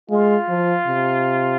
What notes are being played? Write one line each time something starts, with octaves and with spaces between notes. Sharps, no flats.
G#3 F4
F3
C3